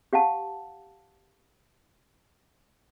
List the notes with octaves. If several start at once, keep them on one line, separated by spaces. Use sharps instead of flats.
G4 F5 F#5 A5